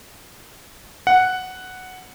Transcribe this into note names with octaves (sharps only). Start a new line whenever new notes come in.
F#5